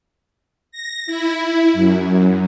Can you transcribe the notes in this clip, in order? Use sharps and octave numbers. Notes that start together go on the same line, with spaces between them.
A#6
E4
F#2